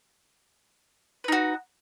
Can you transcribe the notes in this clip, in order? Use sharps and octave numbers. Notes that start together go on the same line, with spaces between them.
D#4 F#4 B4